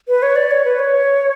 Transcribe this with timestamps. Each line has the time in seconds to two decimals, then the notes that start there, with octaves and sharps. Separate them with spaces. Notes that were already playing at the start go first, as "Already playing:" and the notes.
0.08 B4
0.23 C#5
0.36 D5
0.51 C#5
0.65 B4
0.79 C#5